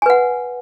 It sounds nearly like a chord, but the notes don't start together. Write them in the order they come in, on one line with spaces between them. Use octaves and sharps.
G#5 B4 F#5